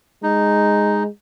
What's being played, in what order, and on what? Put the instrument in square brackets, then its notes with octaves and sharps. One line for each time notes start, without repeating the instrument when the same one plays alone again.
[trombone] G#3 [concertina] D#4